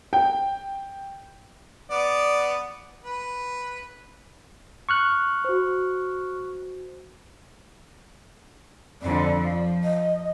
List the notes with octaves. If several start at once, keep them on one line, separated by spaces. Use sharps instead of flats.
G5
B3 D5
B4
C#6 F6 F#6
F#4 C5
F2 D3 D5
F3
D#5